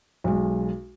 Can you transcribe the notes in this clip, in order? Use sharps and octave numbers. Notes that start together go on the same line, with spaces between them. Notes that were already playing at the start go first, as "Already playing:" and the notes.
B1 G#3